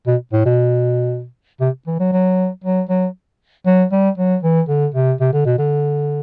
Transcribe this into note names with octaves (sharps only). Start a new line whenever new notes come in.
B2
A2
B2
C3
E3
F#3
F#3
F#3
F#3
F#3
G3
F#3
E3
D3
C3
C3
D3
B2
D3